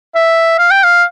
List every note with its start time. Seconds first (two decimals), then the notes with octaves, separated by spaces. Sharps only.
0.15 E5
0.59 F5
0.71 G5
0.83 F5